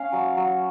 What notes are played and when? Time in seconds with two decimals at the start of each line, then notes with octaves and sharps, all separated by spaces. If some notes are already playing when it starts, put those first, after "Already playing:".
Already playing: C#4 F5
0.13 F#3
0.37 F#3